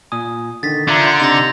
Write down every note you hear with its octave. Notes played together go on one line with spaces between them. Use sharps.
A#2 G#5 D#6
D3 D#3 A6 B6
D3 D4 F4 E5 A#5 G#6
C6 G6
C3 D#4 A#6 F7